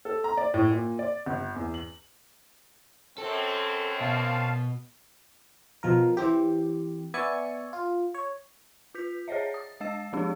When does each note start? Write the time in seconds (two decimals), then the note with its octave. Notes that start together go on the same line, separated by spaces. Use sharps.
0.05 A4
0.24 A#5
0.37 D5
0.54 A2
0.71 A#2
0.99 D5
1.26 G1
1.55 E2
1.74 F#7
3.18 F#2 C4 A4
4.01 B2 F5 A5
5.83 B2 F3 A#4
6.17 E3 C4 G4
7.14 B3 D5 E5 G#5 C#6 C#7
7.73 F4
8.14 C#5
8.95 F4 G6 B6
9.28 G#4 C5 C#5 D#5 E5
9.54 D#6
9.80 G#3 D#5 E6 A6 E7
10.13 F3 G#3 C4 D4 G4